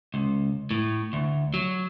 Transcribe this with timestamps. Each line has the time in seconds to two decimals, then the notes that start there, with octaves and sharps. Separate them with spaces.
0.14 C#2
0.71 A2
1.13 D2
1.54 F#3